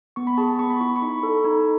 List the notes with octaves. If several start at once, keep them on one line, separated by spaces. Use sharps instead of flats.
B3 C#6
B5
G#4 A5
B5
B3 C#6
B5
E4 C#6
C#6
D#4 B5
A4
D#4